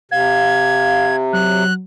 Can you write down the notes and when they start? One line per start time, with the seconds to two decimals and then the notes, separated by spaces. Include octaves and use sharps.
0.11 C3 F5 G#6
1.33 F#3 F#6